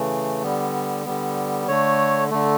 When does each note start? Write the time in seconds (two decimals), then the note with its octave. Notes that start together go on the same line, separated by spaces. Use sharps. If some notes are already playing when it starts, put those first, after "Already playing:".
Already playing: C#3 E3 A3
0.43 D3 G3 B3
1.05 D3 G3 B3
1.68 D3 A3 C#5
2.31 D3 A3